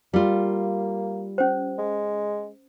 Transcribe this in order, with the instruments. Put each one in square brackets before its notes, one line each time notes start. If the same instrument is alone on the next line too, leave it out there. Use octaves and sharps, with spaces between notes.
[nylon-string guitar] G3 F4 [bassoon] A#3
[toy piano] C#4 C5
[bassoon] G#3